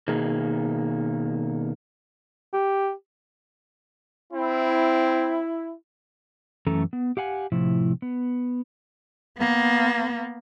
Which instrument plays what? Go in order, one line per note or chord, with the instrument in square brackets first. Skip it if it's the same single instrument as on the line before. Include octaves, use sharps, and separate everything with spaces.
[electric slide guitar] B2 D#3 A#3 G#4
[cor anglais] G4
[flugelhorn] C4 [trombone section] E4
[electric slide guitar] F#2 E3 A3 C#4 A4 A#5
B3
G4 F5 F#5 G#5
A2 C3 F3 E4
B3
[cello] A#3 B3